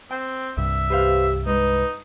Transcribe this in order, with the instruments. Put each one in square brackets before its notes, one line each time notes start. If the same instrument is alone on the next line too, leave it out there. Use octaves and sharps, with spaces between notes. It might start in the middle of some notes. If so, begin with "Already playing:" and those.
[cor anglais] C4 [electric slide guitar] G5
[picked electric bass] C2 G2 [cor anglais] E5
[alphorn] G4 [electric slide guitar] B4 C5 F5
[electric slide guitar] G#3 [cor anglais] D#4 [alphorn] B4